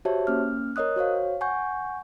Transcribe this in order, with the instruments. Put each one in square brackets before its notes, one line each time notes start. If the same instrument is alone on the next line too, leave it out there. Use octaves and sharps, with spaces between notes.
[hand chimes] F#4 G4 C5 C#5 E5 A5
A#3 C#4 F6
A#4 C#5 D#5 D#6 F#6
F#4 C5 C#5 F5
F#5 G#5 C#6 G6